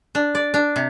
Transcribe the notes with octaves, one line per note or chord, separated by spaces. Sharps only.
D4
D5
D4
C3